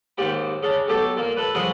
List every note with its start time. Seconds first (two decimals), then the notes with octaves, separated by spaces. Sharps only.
0.18 D#2 G#2 G4 B5
0.63 C#3 D4
0.88 B1 G4 A4 D6
1.17 A#2 A#3
1.37 A4 B4
1.54 C2 F3 G#3 B4 A#5 C6